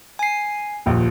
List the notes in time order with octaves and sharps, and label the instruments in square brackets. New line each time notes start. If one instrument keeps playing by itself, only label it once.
[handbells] G#5 C7
[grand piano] D#1 A#1